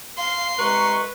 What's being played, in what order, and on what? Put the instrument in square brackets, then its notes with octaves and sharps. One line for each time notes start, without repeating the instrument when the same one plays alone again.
[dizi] F5 [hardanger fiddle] C6
[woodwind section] C2 G#3 C#6 [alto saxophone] B4 [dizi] A#5